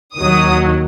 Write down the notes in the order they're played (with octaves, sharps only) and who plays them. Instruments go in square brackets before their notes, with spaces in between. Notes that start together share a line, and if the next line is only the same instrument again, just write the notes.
[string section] D#2 D#3 F#3 D#6